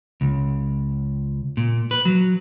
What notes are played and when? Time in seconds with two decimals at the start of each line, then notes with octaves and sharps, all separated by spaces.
0.21 C#2
1.57 A#2
1.91 B4
2.05 F#3